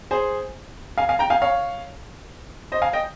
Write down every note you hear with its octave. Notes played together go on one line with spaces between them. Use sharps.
G#4 C5
F5 G#5
F5 G#5
G5 A#5
F5 G#5
C#5 F5
C5 D#5
F5 G#5
D#5 G5